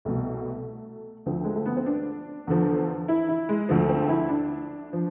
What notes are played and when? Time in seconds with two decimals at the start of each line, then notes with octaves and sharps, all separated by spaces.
0.05 C2 B2 A3
1.26 D2 D3 F3 C4
1.44 G#3
1.55 A3
1.66 B3
1.77 C4
1.86 D4
2.47 E2 D3 F3
3.08 E4
3.29 E4
3.49 G#3
3.69 D2 D3 F3 A3
3.89 C4
4.09 E4
4.29 D4
4.93 F3